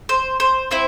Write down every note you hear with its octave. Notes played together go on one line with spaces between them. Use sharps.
C5
C5
C4 E4 C5